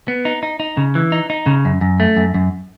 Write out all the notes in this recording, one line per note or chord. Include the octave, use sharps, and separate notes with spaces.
B3
D#4
D#4
D#4
C#3
E3
D#4
D#4
C#3
F#2
F#2
A3
F#2
F#2